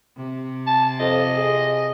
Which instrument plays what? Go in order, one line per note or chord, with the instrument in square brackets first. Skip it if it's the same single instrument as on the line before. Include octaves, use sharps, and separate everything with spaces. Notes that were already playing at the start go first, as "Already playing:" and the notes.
[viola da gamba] C3
[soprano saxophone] A5
[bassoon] F2 [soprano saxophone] D#5
[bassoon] G#4